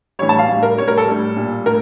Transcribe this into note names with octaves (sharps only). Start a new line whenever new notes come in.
A2 E3 G3 C#5
A5
F5
A2 G3
A#4
A2 G3 C#5
A#4
A4
A2 G3
A#2 G3
A2 A#4